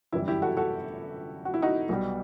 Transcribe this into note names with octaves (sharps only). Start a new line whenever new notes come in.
G1 F#2 E3 G3 E4
E4 G4
F#4 A4
F#4 A4
F#4
E4
D#4 F#4
B1 B2 G3